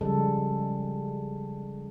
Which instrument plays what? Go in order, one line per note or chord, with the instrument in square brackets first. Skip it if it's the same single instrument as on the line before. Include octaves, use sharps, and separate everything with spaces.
[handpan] C#3 F3 G3 G#3 A4